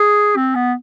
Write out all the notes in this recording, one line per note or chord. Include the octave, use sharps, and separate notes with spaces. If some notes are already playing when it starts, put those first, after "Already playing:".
Already playing: G#4
C4
B3